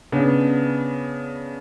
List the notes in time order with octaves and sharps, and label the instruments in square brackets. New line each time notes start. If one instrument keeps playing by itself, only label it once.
[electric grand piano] C#3 B3 D4